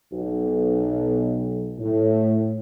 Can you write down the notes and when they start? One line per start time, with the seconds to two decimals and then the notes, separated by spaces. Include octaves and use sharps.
0.12 B1
1.78 A2